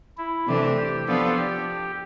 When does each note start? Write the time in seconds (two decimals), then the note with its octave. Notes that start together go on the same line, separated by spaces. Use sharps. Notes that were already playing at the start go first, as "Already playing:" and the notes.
0.18 E4
0.47 C3 E3 A3 D4 G4
0.77 G4
1.07 F3 B3 D4 F4 A4
1.37 G4